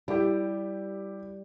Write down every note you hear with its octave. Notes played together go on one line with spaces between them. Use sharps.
G3 E4 G4